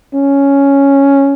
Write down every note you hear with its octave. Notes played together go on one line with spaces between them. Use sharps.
C#4